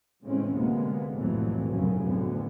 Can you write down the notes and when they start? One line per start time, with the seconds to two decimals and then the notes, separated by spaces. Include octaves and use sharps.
0.25 A2 C#3 E3 G#3 C4 C#4
0.54 D2 C3 G#3 A#3 B3
1.15 C2 F2 A2 E3 F#3 A3
1.69 F1 B1 F#2 C#3
2.03 D2 A2 B3